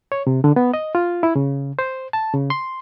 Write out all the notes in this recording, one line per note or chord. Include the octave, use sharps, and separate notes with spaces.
C#5
C3
D3
B3
D#5
F4
E4
C#3
C5
A5
C#3
C6